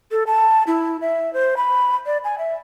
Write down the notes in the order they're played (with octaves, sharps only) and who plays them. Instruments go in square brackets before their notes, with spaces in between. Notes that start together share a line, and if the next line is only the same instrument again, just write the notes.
[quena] A4
A5
E4
E5
C5
B5
D5
G#5
E5